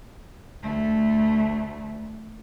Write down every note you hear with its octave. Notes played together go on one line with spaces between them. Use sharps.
D2 A3